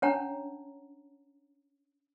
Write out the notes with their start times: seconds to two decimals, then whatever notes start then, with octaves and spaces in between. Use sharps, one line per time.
0.02 C#4 D4 C#5 F#5 A5 A#5